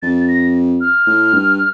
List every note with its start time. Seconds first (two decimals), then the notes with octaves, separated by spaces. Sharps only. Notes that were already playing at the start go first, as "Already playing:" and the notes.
0.02 F2 A6
0.28 A#6
0.81 F6
1.07 A2
1.33 G2